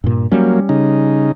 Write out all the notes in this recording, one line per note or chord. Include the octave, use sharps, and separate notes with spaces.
G2 A#2
F#3 G3 A#3 C#4
C#3 D#4